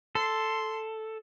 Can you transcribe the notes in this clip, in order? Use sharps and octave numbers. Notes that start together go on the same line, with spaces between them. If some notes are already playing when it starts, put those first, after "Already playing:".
A4 C6